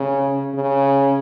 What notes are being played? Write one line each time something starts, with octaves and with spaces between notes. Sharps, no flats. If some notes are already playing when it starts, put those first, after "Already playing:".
Already playing: C#3
C#3